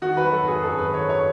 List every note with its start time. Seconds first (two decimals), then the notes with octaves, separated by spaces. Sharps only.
0.02 D#3 F#4
0.17 B4
0.22 F#3
0.32 A4
0.42 G#1
0.48 G#4
0.63 F#2 A4
0.78 D#3 B4
0.94 C#5
1.04 F#2
1.09 C#5